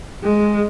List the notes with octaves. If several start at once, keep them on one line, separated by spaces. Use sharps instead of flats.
G#3